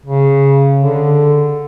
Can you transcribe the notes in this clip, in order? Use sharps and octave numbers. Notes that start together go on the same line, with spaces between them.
C#3
D3